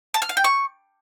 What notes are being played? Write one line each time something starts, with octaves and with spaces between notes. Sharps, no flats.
A5
F6
F5
G5
C#6